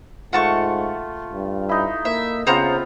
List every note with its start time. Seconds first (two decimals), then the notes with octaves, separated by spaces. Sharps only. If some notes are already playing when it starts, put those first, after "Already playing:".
0.33 G#2 A3 F4 F#5 A5 C#6
1.33 G2
1.69 D#4 E4
2.05 A#3 E5
2.47 C#3 B3 C4 F4 C5 F#5 A#5